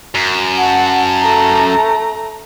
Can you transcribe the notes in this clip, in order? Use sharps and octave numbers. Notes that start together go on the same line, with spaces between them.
F#2
F#5 A5
A3 A#5